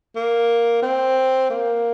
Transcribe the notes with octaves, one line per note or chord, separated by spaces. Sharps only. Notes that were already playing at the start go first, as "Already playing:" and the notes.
A#3
C4
A#3